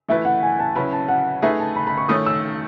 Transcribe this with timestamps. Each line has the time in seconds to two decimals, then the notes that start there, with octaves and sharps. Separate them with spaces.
0.08 E3 A3 E4 B4 E5
0.25 F#5
0.43 G#5
0.60 A5
0.75 C#3 F#3 C#4 E4 B4 B5
0.93 A5
1.08 F#5
1.42 A3 D#4 G#4 B4 E5
1.60 A5
1.76 B5
1.87 B5
1.97 C#6
2.09 D#3 A3 C#4 D#6
2.26 E6